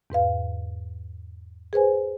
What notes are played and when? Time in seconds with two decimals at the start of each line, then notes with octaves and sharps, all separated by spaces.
0.10 E2 G#2 B4 F5
1.73 G#4 B4 C5 G#5